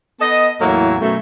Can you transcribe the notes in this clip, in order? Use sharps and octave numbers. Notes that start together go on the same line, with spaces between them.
B3 A4 D#5
E2 A2 F#3 A#3 E4
F#2 B2 A3